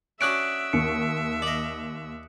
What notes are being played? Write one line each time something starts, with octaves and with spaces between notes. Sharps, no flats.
C#4 D4 F#4 E5 D#6 F#6 D7
D#2 C#7
D5 D#5